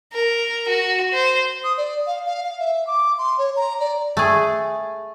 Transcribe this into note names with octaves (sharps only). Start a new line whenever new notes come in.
A#4
F#4
C5
D#6
D5
F5
F5
F5
E5
D6
C6
C#5
A#5
D5
A3 G#4